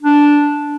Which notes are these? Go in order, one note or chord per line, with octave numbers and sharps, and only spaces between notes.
D4